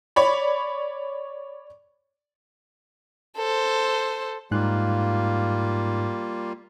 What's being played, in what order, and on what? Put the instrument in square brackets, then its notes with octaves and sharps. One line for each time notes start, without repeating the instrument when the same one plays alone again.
[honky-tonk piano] C#5 D5 B5
[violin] A4 C5
[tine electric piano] G#2 D#4 F#6 [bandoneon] G3 A#3 F4